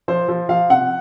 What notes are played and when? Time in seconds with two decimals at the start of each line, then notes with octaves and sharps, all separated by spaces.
0.08 F3 C5
0.28 F3
0.49 F3 F5
0.70 C3 F#5